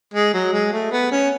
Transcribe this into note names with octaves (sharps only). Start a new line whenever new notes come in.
G#3
F#3
G#3
A3
B3
C#4